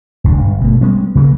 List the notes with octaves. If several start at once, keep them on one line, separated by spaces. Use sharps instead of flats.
D#1 C#2 B2 D4
G1
B2 A3
G3 G#3 B3 C#4
C#3 F#3 A#3